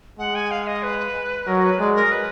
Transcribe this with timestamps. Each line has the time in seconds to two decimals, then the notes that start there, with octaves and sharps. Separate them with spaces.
0.19 G#3 F#5
0.35 G#5
0.51 F5
0.67 D#5
0.83 B4
1.47 F#3 A#4
1.64 B4
1.79 G#3 D5
1.95 A#4
2.12 B4